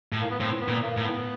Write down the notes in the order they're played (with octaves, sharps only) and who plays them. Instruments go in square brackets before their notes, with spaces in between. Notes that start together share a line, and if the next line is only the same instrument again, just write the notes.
[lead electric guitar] A2
[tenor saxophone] A#3
B3
[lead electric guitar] A2 [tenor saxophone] C4
[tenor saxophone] B3
[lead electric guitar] A#2
[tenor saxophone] A#3
[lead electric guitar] A2
[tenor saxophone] B3